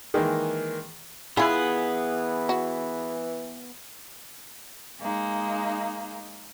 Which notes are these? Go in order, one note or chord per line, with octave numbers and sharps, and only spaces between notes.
D#3 E3 G#3 A#3
E3 B3 E4 F4 G#4 B4
F#4
G#3 A#3 D#4